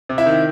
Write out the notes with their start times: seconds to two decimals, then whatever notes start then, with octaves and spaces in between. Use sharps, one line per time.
0.09 C3
0.18 E4 E5
0.26 D#3